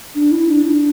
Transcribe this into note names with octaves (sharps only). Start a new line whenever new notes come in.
D4
E4
D4
E4
D4